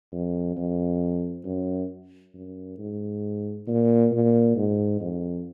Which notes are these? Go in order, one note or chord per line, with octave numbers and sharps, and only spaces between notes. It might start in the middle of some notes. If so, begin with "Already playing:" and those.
F2
F2
F#2
F#2
G#2
A#2
A#2
G#2
F2